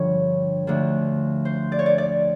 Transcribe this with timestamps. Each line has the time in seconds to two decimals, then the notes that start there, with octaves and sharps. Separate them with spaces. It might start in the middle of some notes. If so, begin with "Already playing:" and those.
Already playing: G2 D3 F3 C#5
0.67 D2 D3 F3
1.45 C5
1.72 D5
1.79 C#5
1.86 D5
1.98 D5